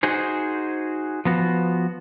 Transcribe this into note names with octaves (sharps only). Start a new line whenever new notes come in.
D#4 F#4 G#4 C5
F3 B3 F#4